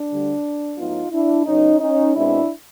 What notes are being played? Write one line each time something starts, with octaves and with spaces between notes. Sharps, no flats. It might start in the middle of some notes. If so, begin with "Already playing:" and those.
Already playing: D4
D2 D3 G3
A2 F#3 B3 D#4 F4
D4 E4
C#3 F#3 B3 C#4 D#4
C#4 D#4
B2 G#3 C4 D4 E4